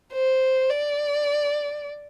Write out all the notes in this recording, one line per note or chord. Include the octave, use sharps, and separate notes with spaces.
C5
D5